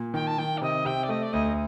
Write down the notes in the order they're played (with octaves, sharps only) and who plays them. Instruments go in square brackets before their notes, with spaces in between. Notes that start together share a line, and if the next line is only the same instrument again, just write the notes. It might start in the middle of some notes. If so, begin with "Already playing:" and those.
Already playing: [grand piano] A#2
[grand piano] D#3 [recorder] G5
[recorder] A5
[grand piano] D#3 [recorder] G5
[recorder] D5
[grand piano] C3 [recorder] D#5
[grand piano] C3 [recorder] G5
[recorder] D5
[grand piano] A3 [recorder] D#5
[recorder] D5
[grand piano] D2 [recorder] D#5